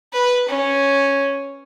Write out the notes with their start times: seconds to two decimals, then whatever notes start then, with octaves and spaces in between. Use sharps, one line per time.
0.13 B4
0.49 C#4